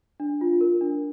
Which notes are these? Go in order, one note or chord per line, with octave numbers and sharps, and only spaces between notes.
D4
F4
A#4
D4